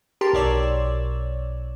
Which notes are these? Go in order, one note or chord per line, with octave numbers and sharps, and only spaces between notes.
G4 A#4 A5 C6
B1 C#5 D5 E6